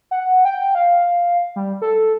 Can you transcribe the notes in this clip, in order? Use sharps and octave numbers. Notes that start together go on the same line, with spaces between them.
F#5
G5
F5
G3
A4